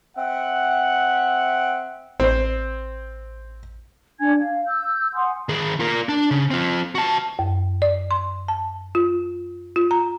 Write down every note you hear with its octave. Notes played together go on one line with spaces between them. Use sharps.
C4 E5 F#5
A1 C4 C5
D4 G#5 G#6
F5
E6 G6
F#5 G#5 C6 D#6
D#3 G#4
F4 A#4
D4
C#3
C4 F4
F#4 A5
F#2
D5
C6
A5
F4
F4
A#5